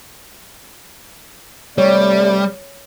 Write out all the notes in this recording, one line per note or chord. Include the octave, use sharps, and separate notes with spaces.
C3 G3 A3 C#5 D5